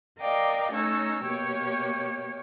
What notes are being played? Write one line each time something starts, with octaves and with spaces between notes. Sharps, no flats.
A#4 D5 D#5 F5 G5
A3 C#4 D#4 C#5 E6
B2 A#3 G4 C#5